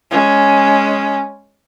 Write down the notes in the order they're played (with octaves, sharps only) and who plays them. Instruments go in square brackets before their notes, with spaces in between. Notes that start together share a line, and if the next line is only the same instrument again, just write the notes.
[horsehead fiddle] G#3 C#4